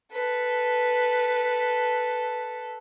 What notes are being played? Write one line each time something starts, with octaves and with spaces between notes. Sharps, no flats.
A4 B4